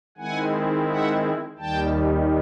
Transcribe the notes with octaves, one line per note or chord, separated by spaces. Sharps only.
D#3 G#3 C4 E4 F#5 G#5
E5 F#5
D#2 D#3 G3 G5 A5